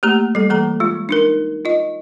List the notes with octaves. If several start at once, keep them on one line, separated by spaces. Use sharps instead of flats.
A3 A#3 G4 A#5
G3 A4
E3 A#3 A4 A#5
G#3 F4
D4 D#4 A#4
F4 D#5